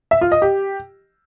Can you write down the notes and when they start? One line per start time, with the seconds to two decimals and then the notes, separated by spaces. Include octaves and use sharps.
0.11 E5
0.21 F4
0.32 D#5
0.42 G4